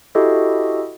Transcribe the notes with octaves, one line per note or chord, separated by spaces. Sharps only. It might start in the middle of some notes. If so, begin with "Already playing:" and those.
E4 F#4 G4 A4 D#5 E5